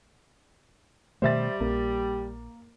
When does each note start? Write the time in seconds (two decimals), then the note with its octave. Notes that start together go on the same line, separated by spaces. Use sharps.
1.22 B2 D#3 G3 A3 C5 E5 A6
1.60 A#1 A#3